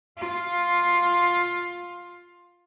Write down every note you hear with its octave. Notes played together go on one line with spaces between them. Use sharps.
F4 F5